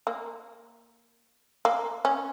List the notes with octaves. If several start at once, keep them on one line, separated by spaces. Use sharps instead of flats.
A#3
A#3
C#4